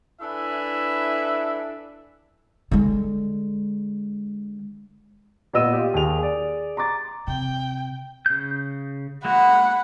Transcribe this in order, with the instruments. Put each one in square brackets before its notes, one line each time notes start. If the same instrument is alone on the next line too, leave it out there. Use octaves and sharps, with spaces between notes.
[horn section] D4 E4 A4 B4 E5 G#5
[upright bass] D3 G#3
[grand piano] A#2 B3 D#5 E6 D#7
F4 G4
D#2 G#4 F7
G#4 D5
A#5 C6 D6 A6
[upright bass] C3 [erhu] G5
[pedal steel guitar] C#3 G6
[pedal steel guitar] G#3 A#3 F#4 [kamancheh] F#5 B5